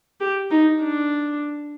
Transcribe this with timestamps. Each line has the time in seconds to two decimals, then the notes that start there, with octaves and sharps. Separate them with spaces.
0.20 G4
0.51 D#4
0.82 D4